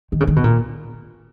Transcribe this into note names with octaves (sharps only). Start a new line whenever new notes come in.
D#3
C#3
D#3
B2
A#2